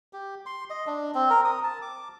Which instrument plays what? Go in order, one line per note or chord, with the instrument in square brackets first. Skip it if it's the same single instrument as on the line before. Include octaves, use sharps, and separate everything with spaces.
[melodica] G4
C6
D#5
D4
C4
A#4
D#6
A5
D6